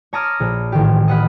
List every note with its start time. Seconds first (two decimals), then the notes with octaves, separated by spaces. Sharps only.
0.13 C#5 A5 A#5 D6 D#6 F6
0.40 A#1
0.72 A1 D#3 G4
1.08 D#5 F5 F#5 B5